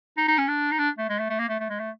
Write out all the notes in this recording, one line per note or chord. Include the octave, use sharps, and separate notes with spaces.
D#4
D#4
C#4
D4
D#4
D4
A3
G#3
A3
A3
A#3
A3
A3
G#3
A3